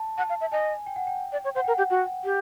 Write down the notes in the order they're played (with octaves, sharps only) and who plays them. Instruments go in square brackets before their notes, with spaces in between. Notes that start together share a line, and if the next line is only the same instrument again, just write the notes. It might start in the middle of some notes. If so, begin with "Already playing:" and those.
Already playing: [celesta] A5
[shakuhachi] F#5 [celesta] A5
[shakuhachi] F5
E5
[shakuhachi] D#5 [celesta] G#5
[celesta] G5
F#5
G5
[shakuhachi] D5
C#5
[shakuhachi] C5 [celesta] F#5
[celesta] G5
[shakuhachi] A#4
[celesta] F#5
[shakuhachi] G4
F#4
G4